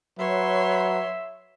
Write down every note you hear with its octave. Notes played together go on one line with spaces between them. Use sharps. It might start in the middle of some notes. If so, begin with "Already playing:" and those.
F#3 B4 C#5 E5 C6